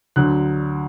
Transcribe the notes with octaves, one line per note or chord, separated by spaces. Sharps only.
D2 D3 F#3 F#6